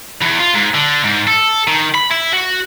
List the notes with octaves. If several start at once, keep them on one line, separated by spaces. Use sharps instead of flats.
E2
F4
G#2
D3
G#2
A4
D#3
B5
E4
F#4